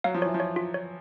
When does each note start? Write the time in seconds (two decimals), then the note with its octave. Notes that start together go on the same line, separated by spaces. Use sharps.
0.04 F#3 F5
0.14 F3
0.22 E3 C#5
0.34 F3
0.40 C#5
0.56 F4
0.74 C#5